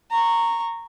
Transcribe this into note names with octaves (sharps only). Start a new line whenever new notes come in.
A#5 C#6